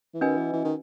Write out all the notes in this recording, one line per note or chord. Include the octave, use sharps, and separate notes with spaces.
E3
D#3 C#4 F#4 B4 D#5 G#5
E3
E3
D#3